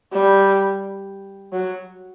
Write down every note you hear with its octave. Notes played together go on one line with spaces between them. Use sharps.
G3
F#3